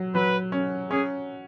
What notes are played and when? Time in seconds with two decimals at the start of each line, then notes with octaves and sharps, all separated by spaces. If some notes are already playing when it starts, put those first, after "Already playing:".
Already playing: F#3
0.15 F#3 B4
0.52 C#4
0.90 C#4 G#4